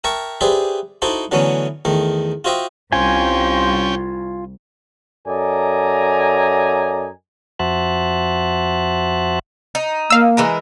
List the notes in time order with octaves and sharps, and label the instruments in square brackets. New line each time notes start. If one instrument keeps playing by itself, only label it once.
[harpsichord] A#4 E5 G5 A5 C#6
G4 G#4 B4 C5 D5 E5
D#4 E4 F#4 A4 C5
D3 E3 F#3 A3 B3 C#4
E2 D#3 A3
F4 F#4 C5 D#5 E5 G5
[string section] C2 [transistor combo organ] C#4 G5 [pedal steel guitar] F4 G#5 [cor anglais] C5
[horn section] F#2 A4 D5 D#5 G#5 A#5
[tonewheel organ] F2 F#4 C5 E5 A5 F#6
[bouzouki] D#4
[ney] A#3 [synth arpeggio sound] F5 E6
[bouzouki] E3 G#3 A#4